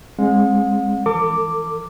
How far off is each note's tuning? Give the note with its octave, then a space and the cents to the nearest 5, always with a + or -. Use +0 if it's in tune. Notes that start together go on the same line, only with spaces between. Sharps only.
G#3 +0 C4 +40 F#5 -45
E3 +35 A4 +45 D6 +0